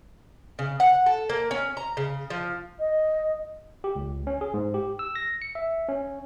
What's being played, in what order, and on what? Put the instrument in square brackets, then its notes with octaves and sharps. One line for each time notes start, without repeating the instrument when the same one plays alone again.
[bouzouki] C#3
F#5
A4
A#3
C#4
A#5
C#3
F3
[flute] D#5
[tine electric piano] G4
C#2
C#4
G#4
G#2
G4
E6
A#6
C#7
E5
C#4